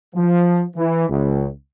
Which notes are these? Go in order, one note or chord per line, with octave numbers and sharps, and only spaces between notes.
F3
E3
C#2